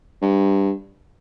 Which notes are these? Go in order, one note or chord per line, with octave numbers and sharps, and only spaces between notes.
G2